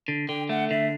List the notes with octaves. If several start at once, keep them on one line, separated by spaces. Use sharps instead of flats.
D3
D3 G5
A3 F#5
D3 E5